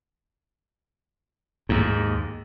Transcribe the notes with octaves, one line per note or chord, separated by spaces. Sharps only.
D#2 G#2